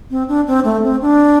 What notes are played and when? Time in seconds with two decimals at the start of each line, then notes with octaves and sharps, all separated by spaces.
0.11 C4
0.29 D4
0.47 C4
0.64 A3
0.84 C4
1.02 D4